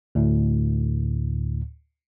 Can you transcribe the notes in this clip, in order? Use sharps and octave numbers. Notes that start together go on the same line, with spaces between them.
D2 A2